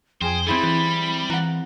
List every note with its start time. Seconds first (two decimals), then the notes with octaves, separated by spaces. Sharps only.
0.22 F2 G#4 C5 G5 D#6
0.47 G3 C4 E4 G#4 B5
0.63 E3
1.30 E3 F#5 A#5